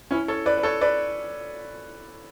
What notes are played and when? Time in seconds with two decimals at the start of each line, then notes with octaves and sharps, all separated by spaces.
0.11 C#4 E4
0.28 A4 C#5
0.46 B4 D5
0.58 B4
0.63 A4 C#5
0.81 B4 D5